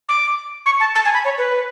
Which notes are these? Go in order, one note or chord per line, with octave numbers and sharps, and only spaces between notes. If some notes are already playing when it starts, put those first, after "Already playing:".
D6
C#6
A5
A5
G#5
B5
C#5
B4